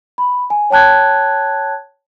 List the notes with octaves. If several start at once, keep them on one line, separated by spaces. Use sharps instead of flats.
B5
G#5
C#5 G5 A5 F#6 G#6